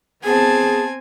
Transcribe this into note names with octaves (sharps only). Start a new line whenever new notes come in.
B3 C4 G#4 G#5 A5